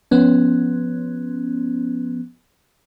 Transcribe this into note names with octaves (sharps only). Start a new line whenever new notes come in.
F3 B3 C#4